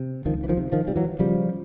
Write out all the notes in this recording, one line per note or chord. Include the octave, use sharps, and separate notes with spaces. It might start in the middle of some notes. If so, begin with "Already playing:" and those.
Already playing: C3
C#2 D#3 F3
E3
D#3 F3
C3
D#3 F3
C3 G3
E3 F#3
C#3 F3 G3